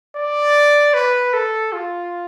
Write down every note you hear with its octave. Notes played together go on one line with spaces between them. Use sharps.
D5
B4
A4
F4